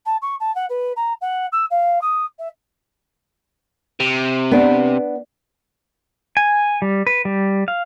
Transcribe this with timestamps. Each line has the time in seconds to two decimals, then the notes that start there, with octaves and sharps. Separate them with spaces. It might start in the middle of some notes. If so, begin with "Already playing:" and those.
0.06 A5
0.22 C#6
0.40 A5
0.55 F#5
0.69 B4
0.96 A#5
1.21 F#5
1.52 E6
1.70 F5
2.01 D#6
2.39 E5
4.00 C3
4.51 B3 D4
6.37 G#5
6.82 G3
7.07 B4
7.25 G3
7.68 F5